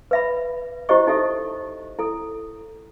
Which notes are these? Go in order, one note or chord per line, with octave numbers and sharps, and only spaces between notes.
B4 E5 B5
E4 G4 C5 D#5 C#6
D#4 G4 A4 E5
E4 A4